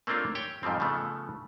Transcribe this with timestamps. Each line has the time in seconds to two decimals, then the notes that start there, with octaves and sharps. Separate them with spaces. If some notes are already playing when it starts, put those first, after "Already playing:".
0.07 A3 A#3 C4 D4 F4 C#5
0.35 G4 C#5 G5
0.63 F2 G#2 F3 G3 C4
0.80 C#3 F3 A3 B3